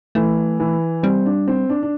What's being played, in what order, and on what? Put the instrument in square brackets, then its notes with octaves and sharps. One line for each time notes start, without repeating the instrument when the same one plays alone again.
[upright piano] E3 [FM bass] A3
[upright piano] E3
[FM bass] G3 [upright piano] C4
[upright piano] D4
C4
D4
D4